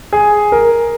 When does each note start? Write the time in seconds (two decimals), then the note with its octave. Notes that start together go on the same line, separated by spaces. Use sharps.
0.13 G#4
0.52 A#4